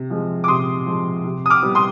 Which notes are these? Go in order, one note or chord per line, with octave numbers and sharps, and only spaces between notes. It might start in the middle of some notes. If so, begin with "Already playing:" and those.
Already playing: C3
F3 G#3
D6
C3 C6 D#6
F3 G#3
C3
D#6
D6 F6
G3 B3
C6 D#6